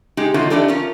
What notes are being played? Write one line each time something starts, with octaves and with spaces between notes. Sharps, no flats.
G#3 D#4 G4
D#3 F#3 A3 A#3 D#4 F4
E3 F3 D4 D#4 G4 A4
C#4 F4 A#4